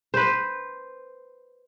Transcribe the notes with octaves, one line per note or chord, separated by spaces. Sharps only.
B4 C5